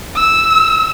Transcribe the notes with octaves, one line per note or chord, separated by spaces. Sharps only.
E6